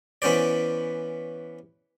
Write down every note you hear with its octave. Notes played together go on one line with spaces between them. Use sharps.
E3 B3 C#4 C5 D5